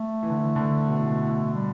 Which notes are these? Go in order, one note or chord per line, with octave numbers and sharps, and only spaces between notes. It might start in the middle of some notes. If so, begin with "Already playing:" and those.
Already playing: A3
E3
D3
E3
D3
B2
A2
B2
A2
G3